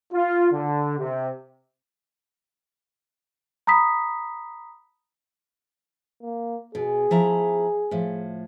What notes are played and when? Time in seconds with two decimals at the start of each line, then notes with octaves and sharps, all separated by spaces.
0.13 F4
0.52 D3
0.98 C3
3.67 A#5 B5 D#6 B6
6.22 A#3
6.75 B2 G#4
7.11 F3 E4 A#5
7.91 A2 F3